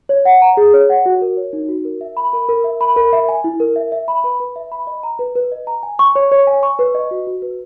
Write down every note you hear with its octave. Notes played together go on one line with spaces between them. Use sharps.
C#5
F#5
A#5
G#4
C#5
F#5
F#4
A#4
C#5
D#4
F#4
A#4
E5
B5
A#4
A#4
E5
B5
A#4
E5
G#5
E4
A#4
E5
E5
B5
B4
B4
E5
B5
D#5
A#5
B4
B4
D#5
A#5
G#5
C#6
C#5
C#5
G#5
C#6
B4
D#5
F#4
F#4
B4